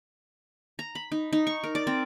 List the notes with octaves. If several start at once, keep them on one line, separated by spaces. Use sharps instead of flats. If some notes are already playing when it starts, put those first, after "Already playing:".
A#5
B5
D#4
D#4
C#6
A#4
D5
C4